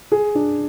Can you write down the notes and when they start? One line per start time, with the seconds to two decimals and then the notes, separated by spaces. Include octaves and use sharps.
0.12 G#4
0.35 D4